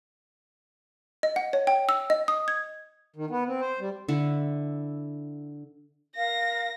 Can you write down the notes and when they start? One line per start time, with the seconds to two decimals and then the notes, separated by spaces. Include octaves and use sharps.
1.23 D#5
1.36 F#5
1.53 C#5
1.67 G5
1.89 E6
2.10 D#5
2.28 D#6
2.48 G#6
3.16 D#3
3.30 B3
3.47 C4
3.61 C5
3.80 G3
4.08 D3 E4
6.16 A#4 F5 A#6